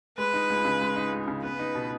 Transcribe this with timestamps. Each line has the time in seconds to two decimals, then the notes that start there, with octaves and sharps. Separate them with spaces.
0.18 G#3 B4
0.34 D#4
0.50 C#2
0.65 C#3
0.81 G#3
0.96 D#4
1.12 C#2
1.28 C#3
1.43 B3 B4
1.59 D#4
1.75 B2